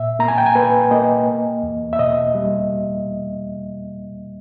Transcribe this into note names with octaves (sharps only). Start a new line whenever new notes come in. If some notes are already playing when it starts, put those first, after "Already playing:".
Already playing: A#2 E5
A#3 A#5
G#5
G5
G#5
A#3 B4
A#3 D#5
A#3
E2
E5
B2 D#5
G3